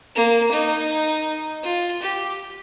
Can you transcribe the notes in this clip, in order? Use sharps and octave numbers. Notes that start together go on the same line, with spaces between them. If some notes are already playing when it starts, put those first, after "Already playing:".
A#3
D#4
F4
G4